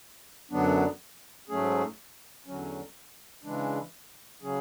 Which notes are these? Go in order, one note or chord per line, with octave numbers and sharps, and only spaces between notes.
F#2 D3 F#3 B3 D4
G#2 F#3 A3 C#4 G#4
E2 D3 F#3 C#4
C#3 E3 G#3 D4
C#3 F#3 C#4 G#4